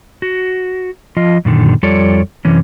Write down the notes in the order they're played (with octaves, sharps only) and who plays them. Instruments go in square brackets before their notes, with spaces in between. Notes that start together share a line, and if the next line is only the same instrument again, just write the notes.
[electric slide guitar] F#4
F3 F4 D#5
F#2 A#2 D3 D#3
F2 G3 F4 A4 C#5 D5
F#2 C3 E3 C#4